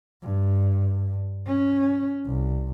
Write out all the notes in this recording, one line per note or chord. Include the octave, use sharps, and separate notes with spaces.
G2
C#4
C2